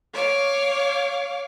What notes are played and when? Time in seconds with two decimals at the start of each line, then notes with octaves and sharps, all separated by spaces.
0.13 C#5 F5 D6